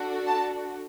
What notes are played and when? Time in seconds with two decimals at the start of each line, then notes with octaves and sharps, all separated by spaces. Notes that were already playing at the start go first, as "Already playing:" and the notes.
Already playing: D4 F#4 A4
0.26 A5